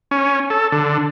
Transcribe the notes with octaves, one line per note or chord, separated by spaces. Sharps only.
C#4
A4
D3